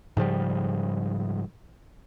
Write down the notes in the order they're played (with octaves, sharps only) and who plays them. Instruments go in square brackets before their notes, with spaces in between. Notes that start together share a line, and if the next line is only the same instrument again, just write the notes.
[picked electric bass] G#2 C#3 F3 G3